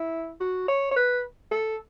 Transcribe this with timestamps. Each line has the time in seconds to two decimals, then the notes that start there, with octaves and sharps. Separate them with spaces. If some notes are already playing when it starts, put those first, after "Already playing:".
Already playing: E4
0.41 F#4
0.68 C#5
0.91 C#5
0.96 B4
1.52 A4